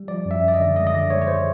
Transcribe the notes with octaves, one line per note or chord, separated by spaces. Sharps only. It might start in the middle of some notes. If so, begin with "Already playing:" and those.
Already playing: G3
F3 D5
F#2
E5
F#2
D5
D#5
D3
G#3 D#5
D#5
D3 D5
G#3 C#5
C#5
G#3 C5